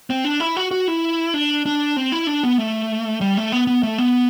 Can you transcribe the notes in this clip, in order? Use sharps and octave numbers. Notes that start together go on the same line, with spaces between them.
C4
D4
E4
F#4
F#4
E4
D4
D4
C4
E4
D4
B3
A3
G3
A3
B3
B3
A3
B3